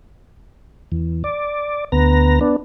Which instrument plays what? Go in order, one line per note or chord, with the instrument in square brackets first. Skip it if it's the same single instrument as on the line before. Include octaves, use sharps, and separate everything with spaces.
[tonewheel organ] E2
D5
D2 B3 A#5
B3 D4